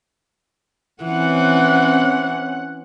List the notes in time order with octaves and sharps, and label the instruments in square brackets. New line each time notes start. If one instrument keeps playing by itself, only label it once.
[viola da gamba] E3 [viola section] C4 C#4 F#5